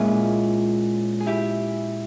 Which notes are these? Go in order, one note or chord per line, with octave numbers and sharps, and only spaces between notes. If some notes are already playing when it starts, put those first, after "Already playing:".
Already playing: A#2 G#3 C#4 E4 F4 G#4
G#4
E4 G4